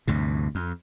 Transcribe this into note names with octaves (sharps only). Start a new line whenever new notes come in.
D2 G2 C3
F2